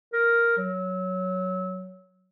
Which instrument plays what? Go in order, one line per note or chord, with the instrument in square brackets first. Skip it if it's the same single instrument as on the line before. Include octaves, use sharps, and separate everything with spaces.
[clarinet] A#4
F#3